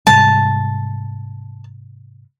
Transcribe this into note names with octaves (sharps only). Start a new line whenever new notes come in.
G#2 C3 G3 A5